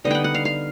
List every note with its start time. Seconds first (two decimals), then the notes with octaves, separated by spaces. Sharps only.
0.04 D3 G3 B3 D#4 D#5
0.10 F#5 G5
0.24 F#5
0.34 F5
0.45 F5